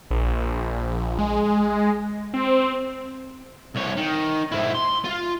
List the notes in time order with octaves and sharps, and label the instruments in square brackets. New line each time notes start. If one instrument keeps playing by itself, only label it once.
[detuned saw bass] A#1
G#3
C4
[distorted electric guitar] C2 C#5
D#3
G#2 E4
C6
F4